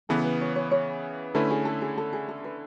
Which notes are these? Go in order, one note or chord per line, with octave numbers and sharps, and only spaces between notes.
C#3 E3 B3 A4
B4
C#5
C#5
C#5
D3 A3 C#4 E4 B4
G#4
A4
G#4
A4
G#4
A4
B4